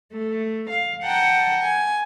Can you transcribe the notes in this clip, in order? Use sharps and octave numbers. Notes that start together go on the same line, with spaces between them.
A3
F5
F#5 G5 A5 A#5
G#5